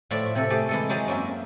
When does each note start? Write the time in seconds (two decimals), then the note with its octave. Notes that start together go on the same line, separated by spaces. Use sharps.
0.11 A2 F3 C#5 D5 E5
0.35 C3 A4
0.50 A3 G4 G#4 A5
0.69 E3 G#3 A4
0.89 F#3 G#3 G4 C5 A5 A#5
1.08 F#2 F#3 A#3 C#4 E5